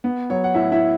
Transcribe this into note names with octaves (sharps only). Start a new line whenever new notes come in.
B3
F#3 C#5
F#5
A2 E4 E5
E4 E5